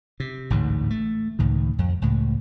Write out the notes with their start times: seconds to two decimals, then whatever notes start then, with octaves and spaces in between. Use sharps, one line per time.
0.20 C3
0.50 A1 D2 G#2
0.90 A3
1.39 C#2 A2 D#3
1.79 F2
2.02 C#2 A2